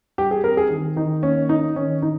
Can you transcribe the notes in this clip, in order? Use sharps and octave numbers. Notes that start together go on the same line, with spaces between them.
G3 G4
G#4
C4 A#4
G#4
D#3
D#3 D#4
A#3 C#4
C#4 D#4
D#3 C#4
D#3 D#4